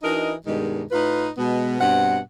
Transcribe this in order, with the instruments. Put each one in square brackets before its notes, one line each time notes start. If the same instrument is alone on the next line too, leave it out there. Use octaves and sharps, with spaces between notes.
[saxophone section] E3 D4 D#4 F#4 A#4 D#5
G2 B2 D#3 G3 G#3
A2 D#4 F4 B4
B2 G#3 B3
G2 B2 C4 F#5